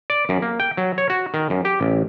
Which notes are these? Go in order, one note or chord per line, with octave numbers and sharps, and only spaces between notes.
D5
F#2
A#3
G5
F#3
C#5
F#4
D#3
F#2
G4
A1